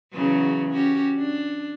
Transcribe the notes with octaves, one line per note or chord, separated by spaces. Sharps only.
E2 C#3 F#3
C#4 F#4 G4
D4